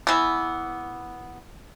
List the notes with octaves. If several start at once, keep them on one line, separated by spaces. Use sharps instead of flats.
E3 B3